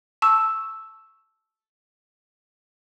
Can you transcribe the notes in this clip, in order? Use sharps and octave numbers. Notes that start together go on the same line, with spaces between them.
A5 C#6 E6